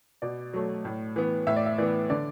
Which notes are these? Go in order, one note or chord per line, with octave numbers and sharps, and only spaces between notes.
B2 D5
F#3 A3
A2
E3 B3
A2 E5
D5
E5
E3 B3 D5
D3 D5